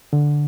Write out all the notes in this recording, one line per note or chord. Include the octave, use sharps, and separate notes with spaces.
D3